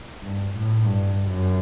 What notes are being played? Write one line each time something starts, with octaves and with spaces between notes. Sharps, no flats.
G2
A2
G2
F#2